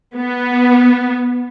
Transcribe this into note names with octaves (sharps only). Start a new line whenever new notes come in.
B3